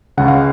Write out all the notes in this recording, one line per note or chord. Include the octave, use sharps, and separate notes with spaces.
C#2 C#3 F#5
F5